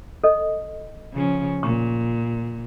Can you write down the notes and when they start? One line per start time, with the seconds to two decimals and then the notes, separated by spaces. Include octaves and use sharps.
0.24 A4 D#5
1.13 C#3 F3 C#4
1.63 A#2 C#6